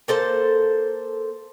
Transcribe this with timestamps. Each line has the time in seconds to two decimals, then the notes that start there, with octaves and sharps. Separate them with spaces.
0.08 A#3 A4 C5 A5